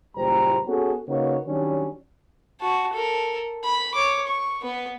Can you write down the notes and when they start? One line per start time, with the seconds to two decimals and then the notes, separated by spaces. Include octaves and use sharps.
0.16 F#1 E2 A#2 G3 C5 A#5
0.67 B3 C#4 F#4 G#4 A4
1.08 C#3 A#3 D#4 F#4 B4 C#5
1.46 D#3 F#3 G3 C#4 D4
2.60 F#4 A5
2.93 A4 A#4
3.64 B5
3.95 C#5 D6
4.27 C#6
4.62 B3 B4